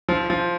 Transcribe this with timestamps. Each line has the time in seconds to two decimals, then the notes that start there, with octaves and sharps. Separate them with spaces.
0.08 F3
0.30 F3